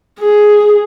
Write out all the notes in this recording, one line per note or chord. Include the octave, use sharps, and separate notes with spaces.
G#4